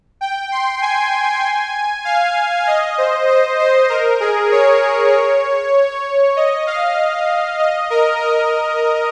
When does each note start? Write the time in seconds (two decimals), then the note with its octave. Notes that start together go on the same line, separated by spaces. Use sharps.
0.21 G5
0.52 C6
0.82 G#5
2.05 F5
2.67 D#5
2.98 C5
3.28 C5
3.59 C5
3.90 A#4
4.20 G#4
4.51 C#5
6.37 D#5
6.67 F5
7.60 D#5
7.90 A#4
8.20 A#4